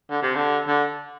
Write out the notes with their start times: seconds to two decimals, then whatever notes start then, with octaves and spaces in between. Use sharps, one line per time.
0.10 D3
0.22 C3
0.35 D3
0.67 D3